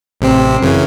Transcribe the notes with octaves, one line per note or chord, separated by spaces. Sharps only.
A1 C3 C4
F#2 C#3 E3